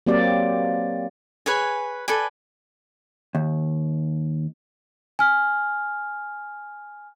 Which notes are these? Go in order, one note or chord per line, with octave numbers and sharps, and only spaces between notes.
F#3 A#3 C4 G4 D5
G#4 B4 C#5 G#5
A4 B4 D5 G#5
D#2
G#5 F6